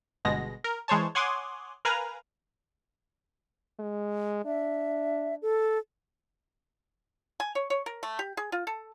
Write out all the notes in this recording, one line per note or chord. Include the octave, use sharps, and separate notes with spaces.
G1 B2 G#3 A#6
A#4
E3 G#3 C5 C#5 A5
C#5 F#5 G#5 C6 D6 D#6
A#4 B4 F5 G#5 A#5
G#3
D4 E5
A4
G#5
C#5
C#5
A#4
A3
G4
G#4
F4
A4